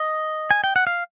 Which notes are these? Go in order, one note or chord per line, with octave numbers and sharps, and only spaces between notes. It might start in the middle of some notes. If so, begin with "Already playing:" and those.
Already playing: D#5
G#5
G5
F#5
F5